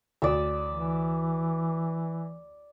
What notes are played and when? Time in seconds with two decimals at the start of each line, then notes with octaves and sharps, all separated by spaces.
0.22 D2 D5 E6
0.72 E3